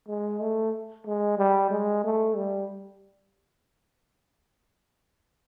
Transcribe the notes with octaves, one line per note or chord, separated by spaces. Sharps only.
G#3
A3
G#3
G3
G#3
A3
G3